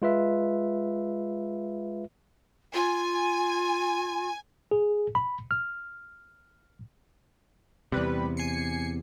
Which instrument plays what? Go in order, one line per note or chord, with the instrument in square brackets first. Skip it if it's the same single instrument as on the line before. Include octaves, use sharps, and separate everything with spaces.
[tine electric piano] G#3 F4 B4 E5
[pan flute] F4 [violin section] G#5
[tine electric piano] G#4
B5
F6
[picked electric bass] E2 C3 [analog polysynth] G3 B4
[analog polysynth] G#5 C7 C#7